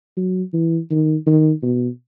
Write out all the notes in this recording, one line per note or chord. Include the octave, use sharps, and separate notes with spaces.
F#3
E3
D#3
D#3
B2